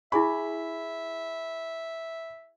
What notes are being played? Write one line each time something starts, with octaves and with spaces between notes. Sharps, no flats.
E4 G#4 E5 G#5 B5 C#6